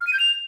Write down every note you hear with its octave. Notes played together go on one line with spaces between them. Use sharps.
F6
D#7
G6
F7